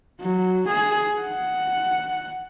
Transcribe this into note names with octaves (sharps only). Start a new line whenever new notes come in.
F#3
G#4
F#5